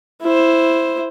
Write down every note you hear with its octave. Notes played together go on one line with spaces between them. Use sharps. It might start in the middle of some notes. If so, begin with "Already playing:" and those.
E4 C5